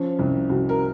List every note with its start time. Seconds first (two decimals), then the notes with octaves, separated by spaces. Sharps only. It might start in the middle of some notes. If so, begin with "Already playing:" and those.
Already playing: F3 C#4
0.19 C2
0.49 C2 F#4
0.69 A#4